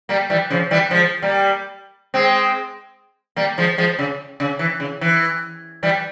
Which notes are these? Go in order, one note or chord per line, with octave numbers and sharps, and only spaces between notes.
G3 A#3
E3 G3
C#3 F3
E3 G3
F3 G#3
G3 A#3
G#3 C4
G3 A#3
F3 G#3
F3 G#3
C#3
C#3
E3
C#3
E3
E3 G3